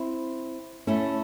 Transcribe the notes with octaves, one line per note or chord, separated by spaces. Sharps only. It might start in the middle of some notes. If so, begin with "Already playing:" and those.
Already playing: C4 E4
A3 C#4 E4 A4